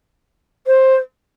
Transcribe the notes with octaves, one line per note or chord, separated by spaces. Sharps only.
C5